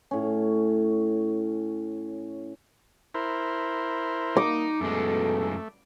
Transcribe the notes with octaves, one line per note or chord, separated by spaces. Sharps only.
A2 C#4
E4 A#4 C5
A#3 D#4 D6
F#2 B2 G#3 A3 A4